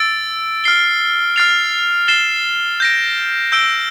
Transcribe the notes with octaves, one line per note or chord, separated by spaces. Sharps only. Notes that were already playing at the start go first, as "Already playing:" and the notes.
Already playing: E6 A6 D7
F6 C7 G7
F6 A6 C7 F7
A6 C7 E7 G7
G6 A#6 D7
E6 G6 D7 G7